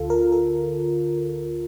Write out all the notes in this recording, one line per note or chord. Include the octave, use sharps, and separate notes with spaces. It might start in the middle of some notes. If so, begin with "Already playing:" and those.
Already playing: D2 D3 F4 A4
A#4
A4